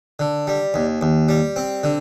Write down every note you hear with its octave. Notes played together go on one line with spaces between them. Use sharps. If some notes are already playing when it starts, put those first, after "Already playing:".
D3
G3
D#2
D#2
G3
C4
D3